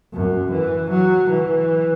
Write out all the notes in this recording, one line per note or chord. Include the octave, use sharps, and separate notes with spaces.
F#2
E3
F#3
E3